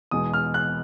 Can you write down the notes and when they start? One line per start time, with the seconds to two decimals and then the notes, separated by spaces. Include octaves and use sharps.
0.11 E2 B2 G#3 D#6
0.34 F6
0.54 F#6